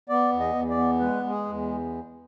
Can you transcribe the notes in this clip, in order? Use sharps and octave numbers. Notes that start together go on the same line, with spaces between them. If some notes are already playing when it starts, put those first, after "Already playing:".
B3 D5
E2
D#5
E2
D5
B3
G#3 B4
G#3
G#4
E2